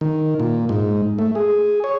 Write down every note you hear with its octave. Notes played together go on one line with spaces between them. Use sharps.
D#3
A#2
G#2
A3
G#4
C#5